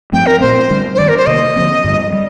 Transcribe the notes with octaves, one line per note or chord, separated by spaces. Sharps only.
G2 F3 A3 C4 G5
A#4
A#2 A3 C4 C5
D3 G3 D4
C5
G2 D#3 G3 D5
A#4
C5
C3 D#3 A#3 D#5
D3 F3 C4
G2 D3 G3
G3